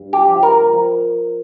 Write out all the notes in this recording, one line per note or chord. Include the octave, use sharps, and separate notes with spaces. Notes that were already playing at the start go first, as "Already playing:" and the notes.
Already playing: G2
G4
F3
A#4
F3